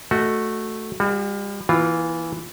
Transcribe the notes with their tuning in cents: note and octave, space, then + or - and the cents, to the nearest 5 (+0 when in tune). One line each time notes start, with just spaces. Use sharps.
A3 +0 F#4 +0 D#5 +0
G3 +40 F#4 -15
E3 +0 A#3 +45 F4 +0